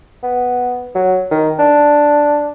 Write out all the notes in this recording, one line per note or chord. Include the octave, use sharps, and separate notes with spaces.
B3
F#3
D#3
D4